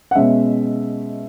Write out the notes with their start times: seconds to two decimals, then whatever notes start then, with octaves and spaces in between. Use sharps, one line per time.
0.11 F#5
0.15 B2 G#3 C#4 E5